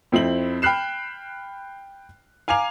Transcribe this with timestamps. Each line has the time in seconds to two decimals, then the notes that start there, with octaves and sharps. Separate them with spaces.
0.12 F2 C4 E4 F#7
0.62 G5 B5 F6 F#6 C7 E7
2.48 F5 G#5 A#5 D6 F7